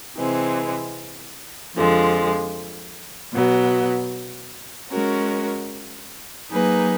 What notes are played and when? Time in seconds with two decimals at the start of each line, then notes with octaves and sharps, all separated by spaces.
0.16 C3 E3 G#3 C4
1.74 F2 D3 F3 G#3
3.32 B2 F#3 B3
4.90 G#3 C#4 F#4 A#4
6.50 F#3 A#3 D#4 G#4 B4